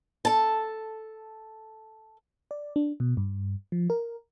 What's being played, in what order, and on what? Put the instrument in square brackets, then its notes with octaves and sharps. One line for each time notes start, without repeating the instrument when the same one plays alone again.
[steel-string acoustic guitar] A4 A5
[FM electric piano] D5
D4
B2
G2
F3
A#4